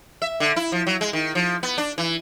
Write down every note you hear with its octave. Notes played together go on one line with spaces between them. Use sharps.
E5
D3
E4
F3
F#3
G#3
D#3
F3
B3
D4
E3